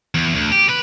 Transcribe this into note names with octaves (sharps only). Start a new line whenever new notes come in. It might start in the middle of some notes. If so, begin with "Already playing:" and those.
E2
D2
G4
B4